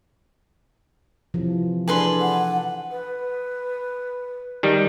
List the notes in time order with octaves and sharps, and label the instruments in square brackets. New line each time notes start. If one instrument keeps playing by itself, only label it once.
[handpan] C3 E3 F3
[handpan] D4 A4 [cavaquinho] G#4 B4 C6
[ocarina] F#5
[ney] B4
[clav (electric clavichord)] D#3 G3